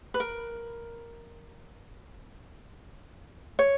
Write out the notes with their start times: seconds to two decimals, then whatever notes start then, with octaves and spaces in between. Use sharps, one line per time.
0.14 B4
0.20 A#4
3.59 C#5